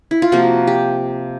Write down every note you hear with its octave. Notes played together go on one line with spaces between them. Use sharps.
E4
F4
C3 F3 A#3 F#4
G4